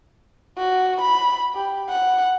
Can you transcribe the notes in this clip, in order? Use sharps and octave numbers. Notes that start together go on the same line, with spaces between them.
F#4
B5
G4
F#5